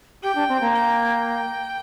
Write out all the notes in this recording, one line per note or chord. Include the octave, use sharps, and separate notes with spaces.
G4 G5
D4
C4
A#3
G5